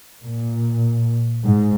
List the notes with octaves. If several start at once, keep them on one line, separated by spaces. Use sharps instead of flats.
A#2
G#2